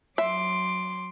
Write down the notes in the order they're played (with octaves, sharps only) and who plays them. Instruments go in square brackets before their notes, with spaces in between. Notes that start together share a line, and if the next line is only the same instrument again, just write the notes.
[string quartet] F#3 C6 D6 [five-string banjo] E5